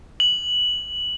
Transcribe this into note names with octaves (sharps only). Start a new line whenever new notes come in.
F#7